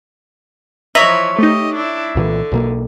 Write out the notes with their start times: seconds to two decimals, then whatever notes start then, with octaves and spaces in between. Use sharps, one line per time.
0.95 E3 F3 C#5 D#5 E5 A#5 B5
1.39 A3 D#4 G4 D#5
1.75 D4 E4
2.15 C2 A#2 D3 E3
2.52 B1 B2 A#3